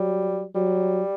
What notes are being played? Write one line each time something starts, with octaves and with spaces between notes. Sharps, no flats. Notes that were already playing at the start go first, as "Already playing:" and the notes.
Already playing: F#3 G3
F#3 G3